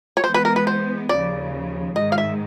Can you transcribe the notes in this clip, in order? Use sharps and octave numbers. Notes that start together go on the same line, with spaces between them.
C#5
E3 G#3 B3 C5
B4
A#4
B4
C5
D#2 C#3 F3 D5
G#2 D#3 G#3 D#5
F5
E5